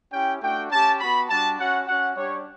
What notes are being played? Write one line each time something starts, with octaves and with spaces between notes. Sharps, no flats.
C#4 E4 G4 G5
A3 D4 F#4 G5
C#4 G4 A5
B3 F#4 B5
G3 D4 F#4 A5
C#4 F#4 F#5
C#4 F#4 F#5
G3 D4 G4 C#5